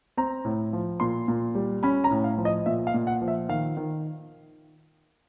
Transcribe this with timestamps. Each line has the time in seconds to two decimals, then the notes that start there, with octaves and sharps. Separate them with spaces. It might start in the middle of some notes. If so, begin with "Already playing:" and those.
0.17 C4 A#5
0.45 A2
0.73 F3
1.00 A#2 C6
1.28 A#2
1.55 G3
1.83 C#4 B5
2.04 A#5
2.11 A2
2.24 F5
2.38 F3
2.45 D#5
2.66 A#2 E5
2.87 F5
2.94 A#2
3.07 F#5
3.22 F3
3.28 E5
3.49 D#3 F5
3.77 D#3